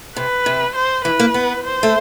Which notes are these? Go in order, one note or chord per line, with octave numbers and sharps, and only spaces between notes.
C3 B4
C3
C5
E3 B4
A#3
B3
C5
A3